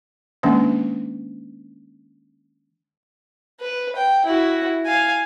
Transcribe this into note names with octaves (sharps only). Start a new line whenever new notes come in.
D#3 G#3 A#3 C#4 D4
B4
G5
E4 F#4
F5 G#5